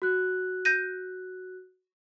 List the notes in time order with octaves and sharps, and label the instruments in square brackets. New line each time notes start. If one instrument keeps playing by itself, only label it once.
[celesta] F#4 F#6
[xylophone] G6 A#6 D#7